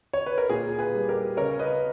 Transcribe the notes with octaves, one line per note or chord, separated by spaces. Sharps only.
C#5
B4
A#4
A#2 G#4
G#4 B4
G3
G4 A#4
C#3 A#4 C#5
B4 D#5